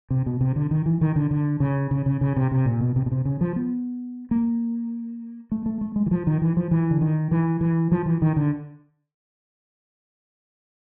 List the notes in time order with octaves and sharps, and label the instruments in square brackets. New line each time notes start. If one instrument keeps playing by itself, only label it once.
[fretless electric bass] C3
B2
C3
D3
D#3
E3
D#3
D3
D3
C#3
C#3
C#3
C#3
C3
C3
A#2
B2
C3
B2
C3
C#3
F3
B3
A#3
A3
A3
A3
G#3
E3
F3
D#3
E3
F3
E3
D3
D#3
E3
E3
F3
E3
D#3
D3